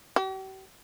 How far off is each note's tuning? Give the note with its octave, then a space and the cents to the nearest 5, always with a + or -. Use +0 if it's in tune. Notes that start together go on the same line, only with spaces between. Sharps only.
G4 -45